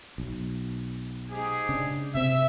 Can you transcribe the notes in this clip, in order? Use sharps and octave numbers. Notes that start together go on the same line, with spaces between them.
B1
G#2 G4 G#4
C#3 D4
C3 C4 E5